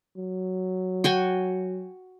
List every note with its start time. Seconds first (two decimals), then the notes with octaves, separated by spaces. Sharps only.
0.17 F#3
1.04 F#4 G5 G#5